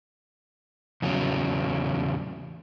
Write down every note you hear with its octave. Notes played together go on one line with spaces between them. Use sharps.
E2 C#3 F#3